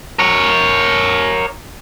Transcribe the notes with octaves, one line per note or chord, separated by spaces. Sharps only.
A#4 C#5